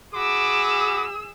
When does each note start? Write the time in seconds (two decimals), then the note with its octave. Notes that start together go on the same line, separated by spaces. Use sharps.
0.14 F#4 G#4 B5 D6 E6